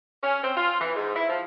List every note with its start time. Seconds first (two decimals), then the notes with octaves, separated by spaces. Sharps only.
0.23 C#4
0.42 C4
0.56 F4
0.79 E3
0.95 G#2
1.14 E4
1.29 F3